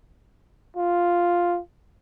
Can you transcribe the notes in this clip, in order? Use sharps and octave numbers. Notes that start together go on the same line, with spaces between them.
F4